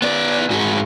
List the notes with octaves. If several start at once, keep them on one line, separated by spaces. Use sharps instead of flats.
B3 D5
G#2 F#4